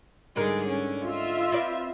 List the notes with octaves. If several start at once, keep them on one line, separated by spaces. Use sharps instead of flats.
G#2 D3 G3 G#3 G#4 A#4
C#4
F4 D#5 E5
C4 B4 D5